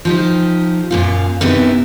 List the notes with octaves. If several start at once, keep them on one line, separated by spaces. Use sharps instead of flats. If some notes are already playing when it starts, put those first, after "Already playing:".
F3 D#4 G4
F#2 A#2 F4
F#2 C3 B3 D#4 E4